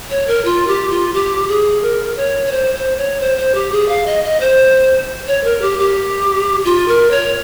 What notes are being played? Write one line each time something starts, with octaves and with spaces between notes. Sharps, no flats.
C#5
A#4
F4
G4
F4
G4
G#4
A#4
C#5
C#5
C5
C5
C#5
C5
C5
G4
G#4
F5
D#5
D#5
C5
C#5
A#4
G4
G4
F4
A#4
C#5